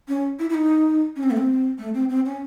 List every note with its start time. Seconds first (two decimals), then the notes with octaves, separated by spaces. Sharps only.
0.08 C#4
0.39 E4
0.49 E4
0.54 D#4
1.16 C#4
1.23 C4
1.31 A3
1.37 C4
1.78 A3
1.94 C4
2.09 C4
2.25 C#4